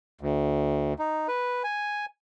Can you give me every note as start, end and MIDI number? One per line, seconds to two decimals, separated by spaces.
0.21 0.93 38
0.99 1.27 63
1.28 1.63 71
1.64 2.06 80